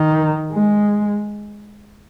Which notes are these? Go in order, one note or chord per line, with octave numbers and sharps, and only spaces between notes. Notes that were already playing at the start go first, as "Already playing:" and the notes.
Already playing: D#3
G#3